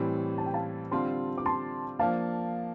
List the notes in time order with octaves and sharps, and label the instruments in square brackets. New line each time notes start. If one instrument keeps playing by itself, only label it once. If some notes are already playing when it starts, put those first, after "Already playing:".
Already playing: [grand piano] A2 E3 G3 C4
[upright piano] A5
G5
F5 A5
[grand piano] D3 G3 C4 F4 [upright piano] A5 C6
[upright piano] D6
A5 C6
[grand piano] F3 A#3 D4 [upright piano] F5 A5